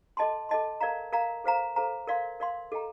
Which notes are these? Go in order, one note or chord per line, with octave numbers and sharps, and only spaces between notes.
A4 D#5 A5 C6
A4 D#5 A5 C6
A#4 D5 F5 A#5
A#4 D5 F5 A#5
A4 C5 F5 A#5
A4 C5 F5 A#5
A#4 D5 F5 C6
A#4 D5 F5 C6
A4 D#5 G5 A#5